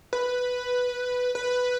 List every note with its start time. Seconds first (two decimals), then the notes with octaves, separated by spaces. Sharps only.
0.13 B4
1.35 B4